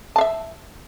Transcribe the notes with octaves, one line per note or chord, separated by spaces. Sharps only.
E5 F5 A5